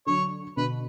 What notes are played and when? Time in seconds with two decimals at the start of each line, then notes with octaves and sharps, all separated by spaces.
0.07 D3 F#3 C#5
0.57 B2 D3 B4